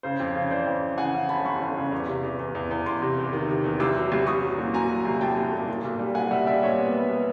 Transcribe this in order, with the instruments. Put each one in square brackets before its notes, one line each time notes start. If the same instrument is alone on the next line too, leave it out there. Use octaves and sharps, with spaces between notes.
[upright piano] C#3 C5
F2
C#3
E3 C5 D5
F2
E3
C#3 F#5 G#5
C#3
G1 A5 B5
G1 B5 C#6
G1
C#3
E2
C3
E2
E2
E2
E2
E2 C6 D6
C3
E2
D#3
C3
E2
C2 D6 E6
F#3
C2
C2 C#6 D#6
F#3
A#2
F#3 G#5 A#5
F#3
C2
C2 G5 A5
C2
A#2
A#2
B1
G3
A#2 F#5 G#5
G3 E5 F#5
G3 D5 E5
A#2 C#5 D#5
B3
B3
B3